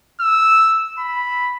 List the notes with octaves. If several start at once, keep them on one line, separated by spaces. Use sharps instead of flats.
E6
B5